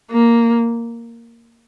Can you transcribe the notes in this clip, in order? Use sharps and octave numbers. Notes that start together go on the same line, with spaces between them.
A#3